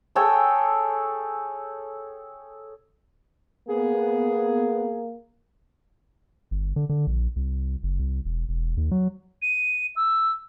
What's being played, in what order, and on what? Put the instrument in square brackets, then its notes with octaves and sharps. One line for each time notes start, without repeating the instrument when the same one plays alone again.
[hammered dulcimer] G#4 A4 C#5 G5
[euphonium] A#3 [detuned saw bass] B3 [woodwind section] G#4
[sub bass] G1
D3
D3
A#1
C2
F#1
C2
E1
E1
D#2
F#3
[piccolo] D#7
E6